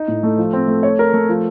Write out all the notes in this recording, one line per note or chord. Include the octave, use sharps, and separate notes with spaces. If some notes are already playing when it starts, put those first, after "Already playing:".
Already playing: D#4
A2
A3
F3
C4
A3
C#5
A#4
A3
F3